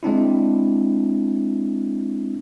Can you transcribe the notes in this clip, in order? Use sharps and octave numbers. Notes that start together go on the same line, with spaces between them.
G#3 C4 D4 E4